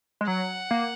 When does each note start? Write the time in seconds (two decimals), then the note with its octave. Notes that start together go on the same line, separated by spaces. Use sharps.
0.21 G#3
0.27 F#3 F#5
0.71 A#3